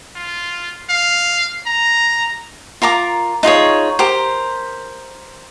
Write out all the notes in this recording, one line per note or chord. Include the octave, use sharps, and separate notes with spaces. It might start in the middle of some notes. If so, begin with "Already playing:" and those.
F4
F5
A#5
F4 A#4 A#5 D6
D#4 F4 G#4 C#5
G4 A#4 C5